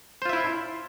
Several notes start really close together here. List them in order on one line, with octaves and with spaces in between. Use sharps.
C5 F4 E5 E4